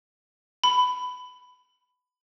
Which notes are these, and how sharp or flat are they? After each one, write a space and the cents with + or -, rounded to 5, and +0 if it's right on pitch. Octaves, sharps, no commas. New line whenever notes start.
B5 +15